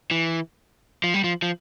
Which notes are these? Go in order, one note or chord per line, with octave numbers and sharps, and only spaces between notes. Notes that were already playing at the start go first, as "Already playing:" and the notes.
E3
F3
G3
F3
F3